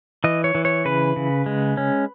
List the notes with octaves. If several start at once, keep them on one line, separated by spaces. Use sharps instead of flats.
E3 D#5
C#5
E3
C#5
C#3 B4
C#3
G#3
C#4